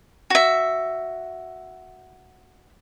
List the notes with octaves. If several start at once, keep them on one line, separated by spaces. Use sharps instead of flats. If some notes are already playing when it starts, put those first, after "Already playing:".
F#4 E5